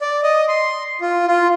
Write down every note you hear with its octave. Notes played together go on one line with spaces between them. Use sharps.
D5
D#5
C6
F4
F4